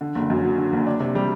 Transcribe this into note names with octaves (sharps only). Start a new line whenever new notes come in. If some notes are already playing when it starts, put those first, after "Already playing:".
D3
F#1
F#2
F#3
D3
F#1
D4
C3
G3